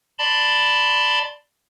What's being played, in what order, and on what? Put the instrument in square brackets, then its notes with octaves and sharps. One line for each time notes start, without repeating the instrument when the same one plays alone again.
[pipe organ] D5 A5 B5 C6